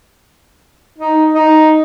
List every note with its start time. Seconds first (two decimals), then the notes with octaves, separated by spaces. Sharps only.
0.98 D#4
1.34 D#4